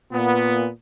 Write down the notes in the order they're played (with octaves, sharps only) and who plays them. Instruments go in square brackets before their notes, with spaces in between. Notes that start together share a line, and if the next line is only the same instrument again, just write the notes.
[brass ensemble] A#2 B3